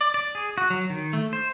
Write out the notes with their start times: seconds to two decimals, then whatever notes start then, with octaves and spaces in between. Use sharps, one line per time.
0.01 D5
0.14 D5
0.35 G#4
0.58 F#4
0.70 F#3
0.90 D#3
1.13 A3
1.33 C5